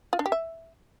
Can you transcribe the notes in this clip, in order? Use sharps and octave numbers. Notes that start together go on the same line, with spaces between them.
F4
D4
G4
E5